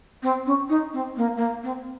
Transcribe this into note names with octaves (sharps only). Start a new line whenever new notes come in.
C4
C#4
D#4
C4
A#3
A#3
C4